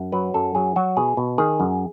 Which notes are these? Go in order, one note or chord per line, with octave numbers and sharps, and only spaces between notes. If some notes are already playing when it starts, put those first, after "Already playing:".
Already playing: F#2
F#3 B4
F#2 A4
F#3 G#4
F#3 F#4
B2 G#4
B2
D#3 G#4
F#2